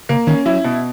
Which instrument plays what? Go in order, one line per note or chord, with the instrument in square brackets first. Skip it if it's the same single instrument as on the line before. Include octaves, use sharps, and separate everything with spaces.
[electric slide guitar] C#3 [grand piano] A#3
[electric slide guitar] D#3 [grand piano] C#4
[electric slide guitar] F#3 [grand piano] E4
[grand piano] B2